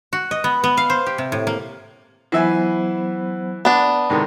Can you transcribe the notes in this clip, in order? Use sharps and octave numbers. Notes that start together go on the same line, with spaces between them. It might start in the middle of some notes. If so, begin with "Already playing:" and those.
F#4
D#5
B3
B3
F5
C5
G4
C3
A2
A#3
E3 F#3 B3 C5 E5 G#5
B3 D4
G#2 C3 D#3 E4 A4 A#4